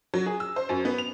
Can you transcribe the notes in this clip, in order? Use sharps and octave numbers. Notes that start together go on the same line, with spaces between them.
F#3
G#4
E6
C5
F#2
B3
F7